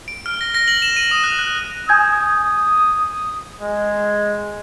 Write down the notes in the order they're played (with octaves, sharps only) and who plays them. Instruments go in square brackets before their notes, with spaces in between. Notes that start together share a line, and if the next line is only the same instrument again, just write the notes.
[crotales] D7
F6
A#6
A#6
F#7
E7
D#7
D#6
F#6
F#6
[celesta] G#5 G6 G#6 [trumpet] D#6
[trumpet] G#3